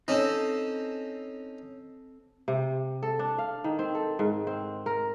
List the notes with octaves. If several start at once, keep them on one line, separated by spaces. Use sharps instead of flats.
C4 C#4 D#4 A4
C3
A4
D4
F5
D#3
C4
A4
G#2
C4
A#4